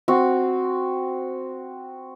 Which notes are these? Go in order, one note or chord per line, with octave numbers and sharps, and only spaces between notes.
C4 F#4